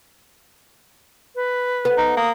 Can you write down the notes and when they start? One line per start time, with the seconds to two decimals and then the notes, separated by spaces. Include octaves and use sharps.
1.35 B4
1.85 B3
1.98 D#4
2.17 A#3 D#6